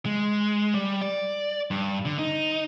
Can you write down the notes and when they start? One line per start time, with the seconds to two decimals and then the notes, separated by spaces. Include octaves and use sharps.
0.06 G#3
0.74 G3
1.01 D5
1.71 G2
2.05 D3
2.19 D#4